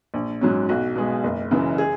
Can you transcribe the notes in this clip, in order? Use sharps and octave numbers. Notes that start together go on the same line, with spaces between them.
A#1
G#2 F#3 C#4
B1 F#4
B2 G#3
F#1
F#2 C#3 E3
G#4